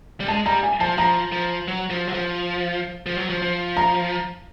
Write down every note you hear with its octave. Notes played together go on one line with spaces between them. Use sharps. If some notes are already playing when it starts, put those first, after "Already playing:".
G3
G#3 A5
G3 A#5
G#5
F3 A5
F3 A#5
F3
F#3
F3
F#3
F3
F3
F#3
F3
F3
A#5